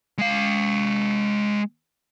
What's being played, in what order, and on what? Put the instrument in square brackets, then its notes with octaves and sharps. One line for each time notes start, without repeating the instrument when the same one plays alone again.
[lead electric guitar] G#3 F5